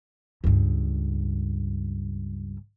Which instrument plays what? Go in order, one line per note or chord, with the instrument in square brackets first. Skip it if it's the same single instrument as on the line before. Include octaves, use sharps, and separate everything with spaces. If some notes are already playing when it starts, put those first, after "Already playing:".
[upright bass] C#2 G2